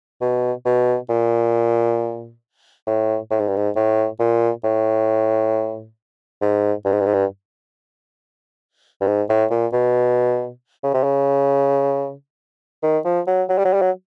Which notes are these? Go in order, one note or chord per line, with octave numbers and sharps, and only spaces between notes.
B2
B2
A#2
A2
A2
G#2
G2
G#2
A2
A#2
A2
G#2
G2
G#2
G2
G#2
G2
G2
G#2
A2
A#2
B2
C#3
C3
C#3
D#3
F3
F#3
F#3
G3
F#3
G3
F#3